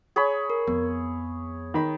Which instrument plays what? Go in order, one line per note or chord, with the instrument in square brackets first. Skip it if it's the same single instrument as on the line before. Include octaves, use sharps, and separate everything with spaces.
[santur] G#4 C#5 B5
[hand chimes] A#4
[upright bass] F2 [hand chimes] B3
[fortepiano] D#3 B5